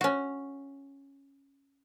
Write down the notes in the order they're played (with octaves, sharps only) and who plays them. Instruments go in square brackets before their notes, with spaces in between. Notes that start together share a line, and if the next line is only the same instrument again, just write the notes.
[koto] C#4 F#4